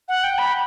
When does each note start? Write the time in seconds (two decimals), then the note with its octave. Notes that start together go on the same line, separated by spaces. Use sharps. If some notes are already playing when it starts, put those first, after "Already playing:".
0.08 F#5
0.24 G5
0.38 B5